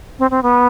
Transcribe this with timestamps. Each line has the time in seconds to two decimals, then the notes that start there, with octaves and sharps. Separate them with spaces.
0.19 C4
0.31 C4
0.43 B3